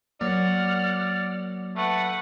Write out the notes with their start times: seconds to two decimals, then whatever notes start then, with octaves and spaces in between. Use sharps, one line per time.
0.21 F#3 A#3 D5 F#5 F6
1.77 A3 B4 F#5